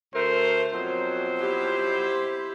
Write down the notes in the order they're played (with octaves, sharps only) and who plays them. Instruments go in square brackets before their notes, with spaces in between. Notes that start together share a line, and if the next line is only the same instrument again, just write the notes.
[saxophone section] D2 A3 A#4 [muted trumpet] C5
[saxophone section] F2 B2 F#3 [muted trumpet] C5
[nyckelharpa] E4 G4